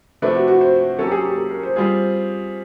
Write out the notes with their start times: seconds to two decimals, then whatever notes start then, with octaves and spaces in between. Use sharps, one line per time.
0.22 C3 F3 A3 D4 B4
0.35 F#4
0.48 F#4
0.61 C5
0.99 F#3 A#3 C#4 A4
1.07 G4
1.12 G#4
1.25 G4
1.37 A4
1.50 A#4
1.63 C5
1.76 G3 C4 F4 G#4